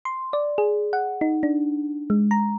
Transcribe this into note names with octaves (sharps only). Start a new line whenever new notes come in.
C6
D5
G#4
F#5
D#4
D4
G#3
A#5